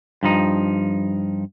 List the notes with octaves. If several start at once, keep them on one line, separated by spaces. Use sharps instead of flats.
G2 F3 D#4